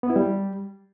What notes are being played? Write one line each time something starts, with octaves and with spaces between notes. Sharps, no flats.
B3
E4
G3